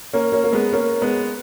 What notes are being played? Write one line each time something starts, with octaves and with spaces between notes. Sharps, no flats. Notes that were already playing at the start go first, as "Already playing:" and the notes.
A#3 C#4
A#3 C#4
A#3
G#3 B3
A#3 C#4
G#3 B3